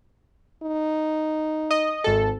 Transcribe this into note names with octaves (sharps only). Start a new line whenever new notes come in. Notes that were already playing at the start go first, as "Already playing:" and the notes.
D#4
D#5
G#1 A4